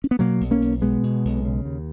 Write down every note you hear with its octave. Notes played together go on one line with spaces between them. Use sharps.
C#4
B3
B2 F#3 A#3
B1
A#3 C#4
B1
B2 G#3 B3
B2
B1
C#3
D#2